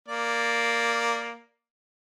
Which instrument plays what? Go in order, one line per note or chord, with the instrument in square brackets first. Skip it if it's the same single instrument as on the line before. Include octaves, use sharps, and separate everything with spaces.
[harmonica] A#3 D5